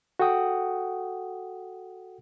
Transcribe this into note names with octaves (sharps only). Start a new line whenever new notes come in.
F#4 A4 F#5 G5 D#6